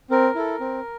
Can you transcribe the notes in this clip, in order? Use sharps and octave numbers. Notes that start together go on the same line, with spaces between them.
C4 A#4
E4 A4
C4